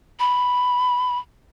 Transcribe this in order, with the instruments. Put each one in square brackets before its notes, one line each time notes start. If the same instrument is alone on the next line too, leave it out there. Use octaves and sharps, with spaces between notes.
[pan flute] B5